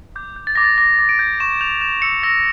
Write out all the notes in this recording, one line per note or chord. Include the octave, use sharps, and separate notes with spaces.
D6 G6
G6
A6
D6 A#6
A6
D6 A#6
D6
D7
G6
C#6 E7
G6 F7
G6 E7
E6 C#7
E6 A#6